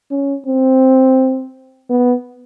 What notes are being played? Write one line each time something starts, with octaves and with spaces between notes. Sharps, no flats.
C#4
C4
B3